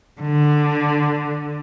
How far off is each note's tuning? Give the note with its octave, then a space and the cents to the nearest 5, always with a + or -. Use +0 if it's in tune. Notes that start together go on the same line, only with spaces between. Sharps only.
D3 +10